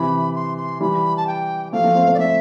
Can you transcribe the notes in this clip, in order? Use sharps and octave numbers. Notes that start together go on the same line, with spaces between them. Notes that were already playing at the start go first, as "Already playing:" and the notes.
Already playing: C3 E3 B5
C6
C6
E3 G3 B5
A5
G5
F3 A3 F5
F3 A3
A3 C4
A3 C4
D5
A3 C4 E5